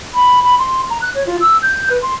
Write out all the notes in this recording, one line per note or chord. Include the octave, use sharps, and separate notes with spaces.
B5
B5
C6
A#5
F#6
C#5
F4
E6
G6
B4
C6